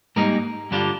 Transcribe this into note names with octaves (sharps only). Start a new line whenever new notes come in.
G#2 G3 A#3 D#4 A#4
G2 D3 G3 D4 F4